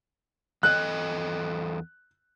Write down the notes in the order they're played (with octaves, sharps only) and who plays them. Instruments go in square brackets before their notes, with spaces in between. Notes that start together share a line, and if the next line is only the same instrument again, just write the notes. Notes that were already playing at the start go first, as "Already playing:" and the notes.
[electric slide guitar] E2 A4 D#5 [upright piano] F#6